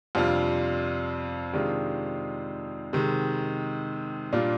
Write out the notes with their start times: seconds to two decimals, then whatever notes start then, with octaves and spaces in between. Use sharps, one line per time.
0.15 F2 C3 G3 D4 F4
1.53 C3 D#3 G#3 D4 F4
2.93 C3 D#3 G#3
4.33 A#2 G3 D4 F4